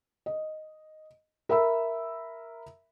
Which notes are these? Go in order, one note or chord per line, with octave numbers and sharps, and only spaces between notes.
D#5
A#4 E5 B5 E6